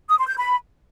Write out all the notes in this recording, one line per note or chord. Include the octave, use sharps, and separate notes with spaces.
D#6
C6
G6
B5